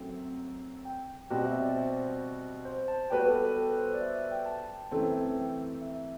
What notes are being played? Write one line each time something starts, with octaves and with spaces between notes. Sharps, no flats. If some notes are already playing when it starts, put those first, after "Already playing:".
Already playing: F#2 F#3 A3 C4
G5
B2 G3 C4 F#4
E5
D5
C5
C5
A5
G3 B3 F#4 B4 G5
A4
A4
A4
C5
D5
E5
E5
G5
A5
F#2 E3 A3 C4 G5
E5